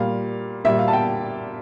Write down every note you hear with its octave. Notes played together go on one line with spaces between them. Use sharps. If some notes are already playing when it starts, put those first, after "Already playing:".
Already playing: A#2 G3 F5
A#2 G3 E5
F5
A5
G5